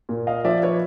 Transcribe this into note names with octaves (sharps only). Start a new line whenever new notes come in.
A#2
D#5 F5
F3 D5 E5
B4 C#5